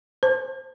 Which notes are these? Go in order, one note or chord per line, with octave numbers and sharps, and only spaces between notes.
C5